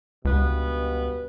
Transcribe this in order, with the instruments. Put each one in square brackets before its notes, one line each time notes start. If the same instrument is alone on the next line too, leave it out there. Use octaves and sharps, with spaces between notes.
[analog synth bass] C#2 [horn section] G2 B2 B3